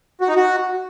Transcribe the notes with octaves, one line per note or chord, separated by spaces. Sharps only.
F#4
D#4
F#4